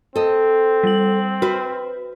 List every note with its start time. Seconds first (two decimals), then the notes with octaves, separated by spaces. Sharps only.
0.16 C4 A4 D#5
0.84 G3 F#7
1.42 F#4 B4 C5